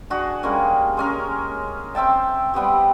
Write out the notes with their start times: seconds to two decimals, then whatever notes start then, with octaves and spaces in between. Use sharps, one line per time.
0.10 D4 F#4 G#4
0.43 G3 G#3 A#3 C#4
0.97 G#3 C#4 A#4
1.95 C4 E5 G5 A5
2.54 G3 B3 C4 G4